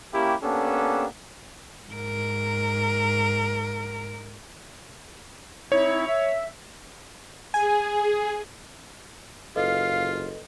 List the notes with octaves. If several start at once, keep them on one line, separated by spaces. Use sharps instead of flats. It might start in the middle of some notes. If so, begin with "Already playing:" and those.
A#3 C#4 E4 G4
A#3 B3 C#4 D4 G4 A4
G#2 A#4
C4 D#4 E4 C#5
E5
G#4 G#5
F#1 F4 A4 B4 D#5 F5